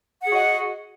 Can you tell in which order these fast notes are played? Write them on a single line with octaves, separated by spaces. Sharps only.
F#5 G#4 F#4 D#5